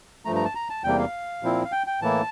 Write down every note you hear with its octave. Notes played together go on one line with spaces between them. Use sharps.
G2 F3 A3 A#5
A#5
A5
A#5
A5
E2 C3 G3 A#3 G5
F5
A#2 F3 C4 E4
F5
G5
G5
A2 E3 A#3 E4 A5